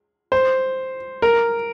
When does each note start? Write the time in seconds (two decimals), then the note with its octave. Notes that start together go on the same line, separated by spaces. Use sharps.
0.32 C5
1.22 A#4